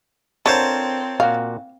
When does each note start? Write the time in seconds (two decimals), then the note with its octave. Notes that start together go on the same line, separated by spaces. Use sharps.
0.46 D3 C4 F4 A#4 C5 C#5 A5
1.20 A#2 F#4 F5